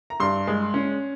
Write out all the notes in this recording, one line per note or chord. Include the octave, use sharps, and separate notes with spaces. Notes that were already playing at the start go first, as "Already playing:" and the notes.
A#5
G2 C6
G#3
C#4